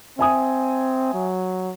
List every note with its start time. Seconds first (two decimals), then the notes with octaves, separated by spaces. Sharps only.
0.19 C4 E5 G#5 D#6
1.14 F#3